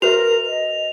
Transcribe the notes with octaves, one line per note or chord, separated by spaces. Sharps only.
F#4 A#4 B4 E5 F7
D#5